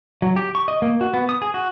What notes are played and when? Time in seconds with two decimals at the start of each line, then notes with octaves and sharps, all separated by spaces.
0.22 F#3
0.36 G4
0.55 C#6
0.68 D#5
0.82 A#3
1.01 F#4
1.14 B3
1.29 D#6
1.42 G#4
1.54 F#4